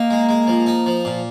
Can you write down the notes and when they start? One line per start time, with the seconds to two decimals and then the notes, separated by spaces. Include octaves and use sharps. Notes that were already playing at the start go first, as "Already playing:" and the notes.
Already playing: A#3 D#4
0.10 G#3
0.29 G#3
0.47 F3
0.66 D#4
0.86 F3
1.05 A#2